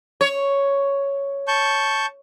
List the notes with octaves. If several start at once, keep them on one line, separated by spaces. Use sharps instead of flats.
C#5
A5 C#6 G6